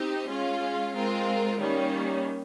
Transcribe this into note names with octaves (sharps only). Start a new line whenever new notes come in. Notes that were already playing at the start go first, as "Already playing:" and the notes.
Already playing: C4 D#4 G4
G#3 C#4 F4
G#3 C4 F4 A#4
D#3 G3 A#3 C#4